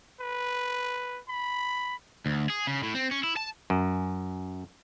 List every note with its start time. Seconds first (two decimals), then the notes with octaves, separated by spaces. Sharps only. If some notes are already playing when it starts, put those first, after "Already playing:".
0.21 B4
1.29 B5
2.26 D2
2.50 G#4
2.67 C#3
2.83 A2
2.95 C4
3.11 C#4
3.24 E4
3.37 A5
3.70 F#2